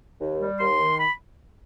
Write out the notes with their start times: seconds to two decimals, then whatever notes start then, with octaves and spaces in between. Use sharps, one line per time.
0.20 D#2
0.41 G3
0.59 D#2 C6
0.79 D#3
0.99 B5